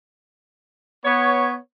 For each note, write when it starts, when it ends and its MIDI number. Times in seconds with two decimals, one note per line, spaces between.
1.05 1.56 59
1.05 1.56 73